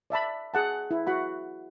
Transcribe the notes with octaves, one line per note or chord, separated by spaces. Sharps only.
D5 E5 A5 B5
G#4 F#5 A5
E4
F#4 F#5 B5